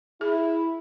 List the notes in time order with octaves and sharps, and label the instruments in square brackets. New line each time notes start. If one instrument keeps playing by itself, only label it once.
[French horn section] E4 [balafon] G#4